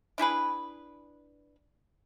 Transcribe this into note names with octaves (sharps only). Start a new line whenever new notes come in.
D4 E4 G#4 B4